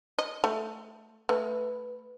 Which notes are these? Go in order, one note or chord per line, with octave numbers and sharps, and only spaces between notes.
D#5
A3
A3 B4